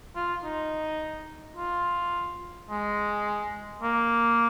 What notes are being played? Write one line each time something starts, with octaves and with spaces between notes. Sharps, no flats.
F4
D#4
F4
G#3
A#3